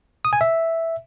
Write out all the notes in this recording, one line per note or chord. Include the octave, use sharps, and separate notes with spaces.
D#6
G#5
E5